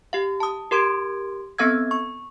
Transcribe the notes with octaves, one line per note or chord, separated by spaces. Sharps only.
G4 F5
A5 D#6
G4 A#4 C6 G#6 D7
B3 C4 A4 F5 E6 G#6
C#6